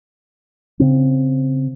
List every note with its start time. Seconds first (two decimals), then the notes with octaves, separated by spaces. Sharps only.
0.80 C#3 C4